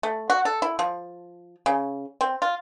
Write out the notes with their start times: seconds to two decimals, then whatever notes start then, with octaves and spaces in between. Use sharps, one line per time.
0.03 A3
0.30 F#4
0.45 A4
0.62 E4
0.79 F3
1.66 C#3
2.21 C4
2.42 F4